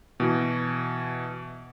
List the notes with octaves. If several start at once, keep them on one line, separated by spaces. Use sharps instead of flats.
B2 E3